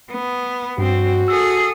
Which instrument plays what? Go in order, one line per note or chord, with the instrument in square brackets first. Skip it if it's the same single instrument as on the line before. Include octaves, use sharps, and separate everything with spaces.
[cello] B3
[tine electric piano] G2 [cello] C4 [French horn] F#4
[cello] G#4 A4 [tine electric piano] E6